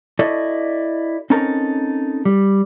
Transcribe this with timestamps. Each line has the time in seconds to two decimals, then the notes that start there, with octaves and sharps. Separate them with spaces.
0.19 E4 F#4 A4 D5 D#5
1.30 C4 C#4 D#4 A4 A#4 A#5
2.25 G3